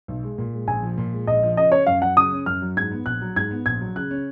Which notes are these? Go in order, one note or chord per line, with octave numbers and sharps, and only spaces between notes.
B1
G#3
A#2
G#3
A#1 G#5
F3
A#2
G#3
A#1 D#5
F3
C#3 D#5
C#4 C#5
F#2 F5
F#3 F#5
C#3 D#6
C#4
F#2 F6
F#3
G#2 G#6
B3
A#1 F#6
F#3
G#2 G#6
B3
A#1 G#6
F#3
C#3 F#6
C#4